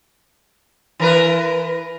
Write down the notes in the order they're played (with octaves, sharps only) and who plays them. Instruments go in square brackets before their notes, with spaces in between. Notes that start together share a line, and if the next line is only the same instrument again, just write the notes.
[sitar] E3 A#4 B4